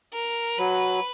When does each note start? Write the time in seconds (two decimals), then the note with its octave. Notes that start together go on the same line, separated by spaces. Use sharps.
0.13 A#4
0.59 F#3 B4